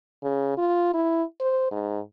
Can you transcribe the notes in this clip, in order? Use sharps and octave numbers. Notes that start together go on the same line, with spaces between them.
C#3
F4
E4
C5
G#2